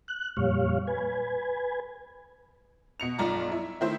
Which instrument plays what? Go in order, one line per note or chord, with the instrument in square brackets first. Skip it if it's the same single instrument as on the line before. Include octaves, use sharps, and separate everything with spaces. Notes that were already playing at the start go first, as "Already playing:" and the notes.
[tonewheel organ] F#6
F2 A#2 G3 C#5 F5
B4 G#5
[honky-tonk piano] B2 C#7 F7
B1 G2 F4 D5 A#5
E4
D#3 A3 E4 C5